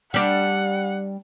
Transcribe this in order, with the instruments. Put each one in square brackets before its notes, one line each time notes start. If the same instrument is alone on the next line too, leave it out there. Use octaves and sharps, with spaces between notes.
[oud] G3 D4 [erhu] F#5